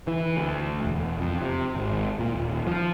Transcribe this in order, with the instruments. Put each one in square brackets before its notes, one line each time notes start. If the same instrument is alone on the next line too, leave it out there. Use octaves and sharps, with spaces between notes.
[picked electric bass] E3
D2
E1
F2
C3
G#1
A#2
D#1
F3